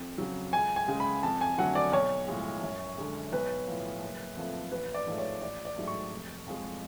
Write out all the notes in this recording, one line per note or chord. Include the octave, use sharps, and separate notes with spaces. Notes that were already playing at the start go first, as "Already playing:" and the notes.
Already playing: F2
C#3 F#3
C#2 G#5
G#5
C#3 G#3
B5
F2 A5
G#5
D3 F#3 A3 F#5
D5
B1 C#5
A2 F3 G#3
F#2
D3 G#3
B1 B4
A2 F3
F#1
F2 F3 A3
A1 B4
D5
G#2 F3 A3
C#5
A1 D5
D5
G#2 F#3 A3
C#6
F1
F2 F3 G#3